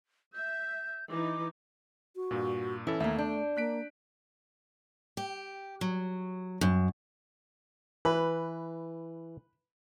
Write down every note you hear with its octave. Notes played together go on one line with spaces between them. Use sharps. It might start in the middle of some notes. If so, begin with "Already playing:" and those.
E5 G6
E3 D#4 D6
F#4
G2 A#2
E3 C#4 E4 A4
D#2 A3 A#3 E5
D4 G6
A#3 F#6 B6 D7
G4
F#3
F#2
E3 B4